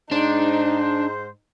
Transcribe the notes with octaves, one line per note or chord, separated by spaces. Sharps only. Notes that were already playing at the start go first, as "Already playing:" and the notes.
G#2 D4 D#4 C5